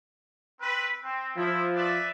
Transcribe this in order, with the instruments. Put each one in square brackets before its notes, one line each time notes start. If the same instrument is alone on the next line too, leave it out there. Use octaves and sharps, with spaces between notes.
[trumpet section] C4 B4
C4
[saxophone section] F3 [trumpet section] E4
[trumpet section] B4 D5 E5